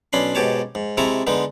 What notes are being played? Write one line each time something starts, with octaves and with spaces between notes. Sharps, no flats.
B1 C#4 D4 B5 C6
G#2 B2 G4 C#5 A5
G#2
C3 G#3 E4 A5 A#5 C#6
D3 G#3 B3 D#4